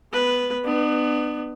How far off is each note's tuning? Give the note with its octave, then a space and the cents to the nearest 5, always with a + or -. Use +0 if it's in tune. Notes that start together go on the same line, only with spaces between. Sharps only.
B3 +5 B4 +0
B3 +15 D4 +40